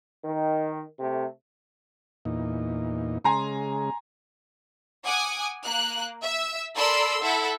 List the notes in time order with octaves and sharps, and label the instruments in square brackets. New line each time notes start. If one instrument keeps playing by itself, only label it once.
[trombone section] D#3
C3 A3
[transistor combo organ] E2 A#2 D#4
[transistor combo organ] C#3 G#3 [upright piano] G#5 A#5 C6
[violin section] F#5 G#5 D6 D#6
A#3 F#6
E5 E6
A4 A#4 D5 B5 C6 E6
E4 A4 E5 F#5